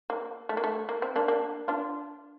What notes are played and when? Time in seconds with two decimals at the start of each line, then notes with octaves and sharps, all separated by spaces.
0.10 A#3
0.49 A3
0.57 A#3
0.64 A3
0.89 A#3
1.02 C4
1.16 A#3 D4
1.28 A#3 D4
1.68 D4 F4